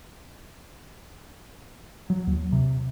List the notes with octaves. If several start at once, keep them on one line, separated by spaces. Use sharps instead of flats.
F#3
D#2
C3